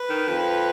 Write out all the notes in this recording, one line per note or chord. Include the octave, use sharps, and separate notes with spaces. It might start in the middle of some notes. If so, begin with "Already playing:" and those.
Already playing: B4
D#3
F2